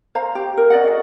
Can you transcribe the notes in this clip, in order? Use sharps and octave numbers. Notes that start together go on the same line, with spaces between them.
C5 F5 A#5
G4
A#4
C#4 D5 D#5 F#5
F#4 G#4 D#5